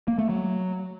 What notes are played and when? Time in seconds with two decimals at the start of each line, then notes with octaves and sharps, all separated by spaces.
0.08 A#3
0.19 A3
0.29 F#3